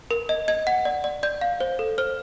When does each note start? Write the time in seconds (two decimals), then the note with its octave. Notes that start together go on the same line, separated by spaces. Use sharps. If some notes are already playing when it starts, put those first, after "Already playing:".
0.11 A#4
0.29 D#5
0.48 D#5 G#6
0.67 F#5
0.85 D5
1.04 D5
1.23 D5 G6
1.41 F5
1.60 C5
1.79 A4
1.98 C5 F6